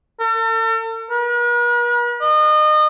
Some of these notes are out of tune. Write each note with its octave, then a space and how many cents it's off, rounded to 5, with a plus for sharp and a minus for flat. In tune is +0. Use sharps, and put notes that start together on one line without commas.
A4 +45
B4 -45
D#5 -30